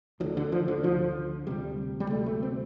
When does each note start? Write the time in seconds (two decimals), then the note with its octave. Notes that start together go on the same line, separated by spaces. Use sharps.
0.20 D2 F3
0.23 D3
0.37 D3
0.52 F3
0.68 D3
0.83 D2 D3 F3
1.47 D2 C3 G3
2.00 G3
2.10 D2 C3 A3
2.26 A3
2.43 C4